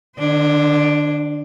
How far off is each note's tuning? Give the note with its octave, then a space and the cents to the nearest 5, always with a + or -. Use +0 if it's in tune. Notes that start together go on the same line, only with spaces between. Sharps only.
D#3 -45 D4 +0 C5 -10